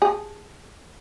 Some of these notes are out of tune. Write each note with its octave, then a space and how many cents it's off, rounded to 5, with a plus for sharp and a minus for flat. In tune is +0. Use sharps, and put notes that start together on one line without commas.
G#4 -5